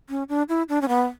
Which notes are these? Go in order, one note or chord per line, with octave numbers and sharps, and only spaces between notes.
C#4
D4
E4
D4
C#4
B3